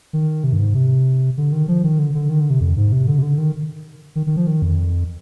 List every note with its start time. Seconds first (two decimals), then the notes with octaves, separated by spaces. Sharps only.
0.13 D#3
0.44 C3
0.53 G2
0.59 G#2
0.74 C3
1.37 D3
1.52 D#3
1.68 F3
1.84 D#3
1.99 D3
2.15 D3
2.29 D#3
2.40 D3
2.50 C3
2.61 F2
2.77 G#2
2.92 C3
3.07 D3
3.18 C3
3.23 D3
3.38 D#3
4.15 D#3
4.27 D#3
4.36 F3
4.47 D#3
4.62 F2